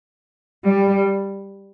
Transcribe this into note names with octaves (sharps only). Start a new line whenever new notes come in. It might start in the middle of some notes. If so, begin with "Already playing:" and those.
G3